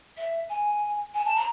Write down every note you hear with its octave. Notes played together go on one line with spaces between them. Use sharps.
E5
G#5
G#5
A5
A#5